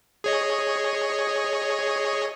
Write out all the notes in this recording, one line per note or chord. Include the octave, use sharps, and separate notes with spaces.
G#4 C#5 D#5